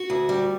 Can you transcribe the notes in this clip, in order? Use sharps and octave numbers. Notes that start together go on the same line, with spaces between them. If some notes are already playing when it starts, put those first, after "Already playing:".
Already playing: F#4
D2
G3